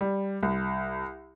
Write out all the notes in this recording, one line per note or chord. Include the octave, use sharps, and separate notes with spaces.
G3
C2